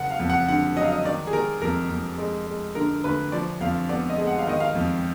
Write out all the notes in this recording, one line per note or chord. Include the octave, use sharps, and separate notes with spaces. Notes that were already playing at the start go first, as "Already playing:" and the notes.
Already playing: F#1 F#5
F5
F2
F#5
D3 F#5
F#3 D#5
F5
D#5
D#3 D5
G#4
D#3 A#4
F2 A#4
F2
G#3
G#3
D3 A#4
D2 B4
F3 D5
F2 F5
B3 D5
D#5
G#3
F#5
F5
D#3 D#5
F5
F2